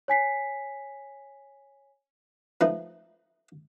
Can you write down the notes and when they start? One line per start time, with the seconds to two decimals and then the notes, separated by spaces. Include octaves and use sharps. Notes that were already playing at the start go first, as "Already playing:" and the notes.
0.08 C#5 G#5 B6 C7
2.61 F3 A3 D#4 B4